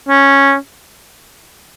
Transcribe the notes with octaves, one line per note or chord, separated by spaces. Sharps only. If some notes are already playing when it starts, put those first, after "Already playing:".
C#4